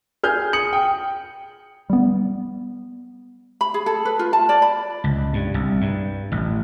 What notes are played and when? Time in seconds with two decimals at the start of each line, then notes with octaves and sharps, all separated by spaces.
0.23 G#4 F6 G6
0.53 D#6 C#7 F#7
0.73 G5
1.90 G3 B3
3.61 B5
3.74 G#4
3.86 A4
4.05 B4
4.19 F4
4.33 A5
4.49 D5
4.62 B5
5.04 C#2
5.33 G2
5.54 C2
5.81 G2
6.32 A1